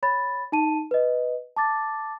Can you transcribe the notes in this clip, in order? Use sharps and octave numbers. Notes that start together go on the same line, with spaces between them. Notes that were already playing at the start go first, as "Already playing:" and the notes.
C#5 B5 A6
D#4 A5 D#7
B4 D#5
A5 D6 A6